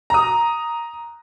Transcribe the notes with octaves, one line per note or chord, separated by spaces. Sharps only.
A#5 D#6